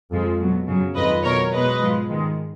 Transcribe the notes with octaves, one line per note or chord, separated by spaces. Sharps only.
F2 F3 G#3
B2 F#3
F#2 C#3 F#3
F2 D#3 G#3 B4 D#5
B2 F#3 A#4 C#5
B2 G#3 B4 D#5
G#2 F3 G#3
G#2 D#3 G#3